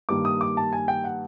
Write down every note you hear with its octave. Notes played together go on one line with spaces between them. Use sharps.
G2 D#3 G3 A#3 D6
D#6
D6
A5
G#5
G5
F#5